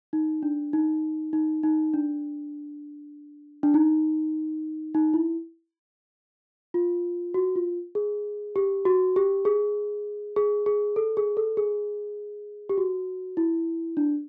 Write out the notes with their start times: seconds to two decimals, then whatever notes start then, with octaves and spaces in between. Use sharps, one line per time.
0.13 D#4
0.43 D4
0.73 D#4
1.33 D#4
1.63 D#4
1.94 D4
3.63 D4
3.74 D#4
4.95 D#4
5.14 E4
6.74 F4
7.34 F#4
7.56 F4
7.95 G#4
8.56 G4
8.85 F#4
9.16 G4
9.45 G#4
10.36 G#4
10.66 G#4
10.96 A4
11.17 G#4
11.37 A4
11.57 G#4
12.69 G4
12.78 F#4
13.37 E4
13.97 D4